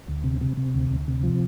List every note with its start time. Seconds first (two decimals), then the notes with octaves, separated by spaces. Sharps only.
0.08 D2
0.24 C3
0.41 C3
0.57 C3
0.75 D2
0.91 D2
1.08 C3
1.23 F3